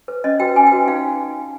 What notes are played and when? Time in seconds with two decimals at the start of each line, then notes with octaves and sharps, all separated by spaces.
0.08 B4
0.24 C#4 D#5
0.40 F#4 B4 G5
0.56 C#4 G#5
0.67 G5
0.72 F#4 B4
0.87 D#4 F5